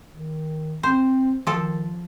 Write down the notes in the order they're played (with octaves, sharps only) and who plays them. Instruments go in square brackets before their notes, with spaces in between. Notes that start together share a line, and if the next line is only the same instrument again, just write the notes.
[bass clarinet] D#3
[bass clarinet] C4 [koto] C5
[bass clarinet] D#3 [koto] F3 A4